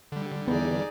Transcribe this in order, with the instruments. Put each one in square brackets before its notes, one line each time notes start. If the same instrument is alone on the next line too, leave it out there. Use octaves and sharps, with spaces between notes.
[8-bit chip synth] D3 G3
[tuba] E2 [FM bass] B3 [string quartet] D#4 G#4 D5